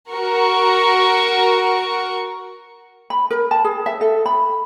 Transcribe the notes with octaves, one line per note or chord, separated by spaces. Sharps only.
F#4 A#4 C#6
B5
A#4
A5
G#4
E5
A4
B5